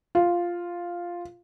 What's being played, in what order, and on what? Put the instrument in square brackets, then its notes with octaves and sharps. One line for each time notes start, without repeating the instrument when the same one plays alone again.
[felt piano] F4